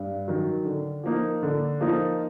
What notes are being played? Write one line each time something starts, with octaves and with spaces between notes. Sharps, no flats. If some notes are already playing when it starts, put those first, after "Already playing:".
Already playing: G2
D#3 F#3
D3
F3 A#3 D#4
D3
F3 A#3 D#4